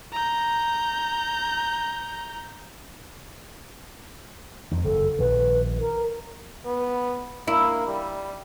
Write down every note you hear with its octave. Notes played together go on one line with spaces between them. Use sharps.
A#5 G6
F2 D#3
F#1 A4
A#1 D#3 B4
A#4
B3
A#3 E4
G3